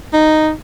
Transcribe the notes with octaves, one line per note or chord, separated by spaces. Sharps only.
D#4